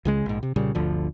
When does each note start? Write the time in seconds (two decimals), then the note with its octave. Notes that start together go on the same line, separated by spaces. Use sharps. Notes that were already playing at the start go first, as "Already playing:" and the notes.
0.05 C#2 C#3 G#3
0.26 A#1 G#2
0.43 C3
0.56 C2 A#2 C#3 G3
0.75 G1 D2 D3 F3